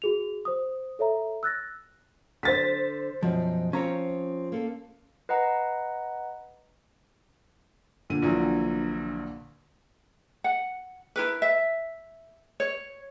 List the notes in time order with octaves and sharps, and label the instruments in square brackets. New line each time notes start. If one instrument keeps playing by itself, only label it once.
[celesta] F#4 G#4 F7
C5 D#6
A4 C#5 E5 A#5
E6 F#6 A6 A#6
[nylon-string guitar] D3 [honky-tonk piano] C5 A6 B6
[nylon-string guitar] F#2 B2 [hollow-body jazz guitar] F3
[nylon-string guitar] F3 C4 C#5 [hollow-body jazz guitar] C#4 A#5
[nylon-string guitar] A#3 A4
[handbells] B4 D#5 F#5 A#5
[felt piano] A#2 D3 D#7
[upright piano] A#1 E3 F#3
[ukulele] F#5
E4 A#4 B4
E5
C#5